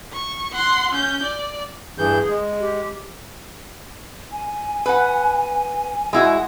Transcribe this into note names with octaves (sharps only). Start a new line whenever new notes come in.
C#6
F#5 C6
C#4 G6
D5
G2 E3 G#4 G6
G#3
G4
G#5
B4 F#5
G#3 E4 F#4